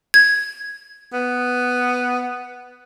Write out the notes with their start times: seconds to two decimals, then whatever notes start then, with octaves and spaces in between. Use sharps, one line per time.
0.14 G#6
1.13 B3